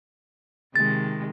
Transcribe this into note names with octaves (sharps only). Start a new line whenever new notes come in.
C3 D#3 G#3 A6